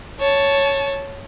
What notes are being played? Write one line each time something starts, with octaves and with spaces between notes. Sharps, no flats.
C#5 A5